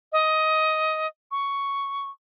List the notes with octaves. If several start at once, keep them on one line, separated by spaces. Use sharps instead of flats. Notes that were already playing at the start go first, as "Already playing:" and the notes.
D#5
C#6